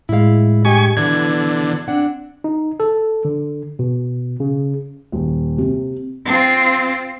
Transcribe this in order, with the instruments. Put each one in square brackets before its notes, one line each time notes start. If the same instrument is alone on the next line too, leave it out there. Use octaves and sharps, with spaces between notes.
[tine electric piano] A2 G#3 [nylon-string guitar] E4 F5
[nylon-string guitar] G2 G4 D#5 [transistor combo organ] G#5 C#6
[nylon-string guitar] B2 E3 [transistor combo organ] D3 [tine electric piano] G#6
[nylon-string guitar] C4 D4 F#5
[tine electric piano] D#4
A4
D3
B2
C#3
[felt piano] D#1
C3
[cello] C4 F4